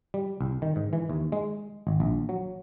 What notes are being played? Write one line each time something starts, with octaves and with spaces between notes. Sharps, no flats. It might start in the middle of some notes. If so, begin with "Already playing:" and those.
G3
C2
D#3
G#2
E3
D#2
G#3
G#1
A#1
F#3